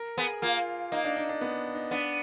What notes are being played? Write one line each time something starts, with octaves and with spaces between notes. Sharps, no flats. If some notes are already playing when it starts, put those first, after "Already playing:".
Already playing: A#4
B3 G#4
A#3 F4
A#3 D#4
D4
D#4
D4
B3
D#4
B3 D4